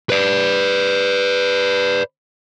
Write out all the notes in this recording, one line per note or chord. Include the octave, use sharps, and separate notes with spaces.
B4 D5